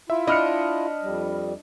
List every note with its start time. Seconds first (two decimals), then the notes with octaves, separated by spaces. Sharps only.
0.10 E4 F4 E5
0.27 D4 D#5 B5 F6 C#7
1.02 F2 G3